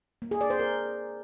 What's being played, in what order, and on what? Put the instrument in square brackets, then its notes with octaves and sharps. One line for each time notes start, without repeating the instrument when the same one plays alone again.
[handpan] A#3
G#4
D5
C5
A#4